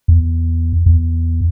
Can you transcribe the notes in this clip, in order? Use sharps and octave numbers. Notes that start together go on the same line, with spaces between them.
E2
E2